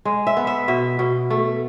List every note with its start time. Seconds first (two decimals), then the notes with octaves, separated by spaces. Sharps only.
0.05 G#3
0.27 E5
0.37 B3
0.47 E5
0.68 B2 E5
0.99 B2
1.30 A3